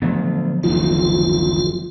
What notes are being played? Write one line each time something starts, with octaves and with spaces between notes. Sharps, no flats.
D3 F3 F#3 A3 B3
F#1 D2 D#3 F4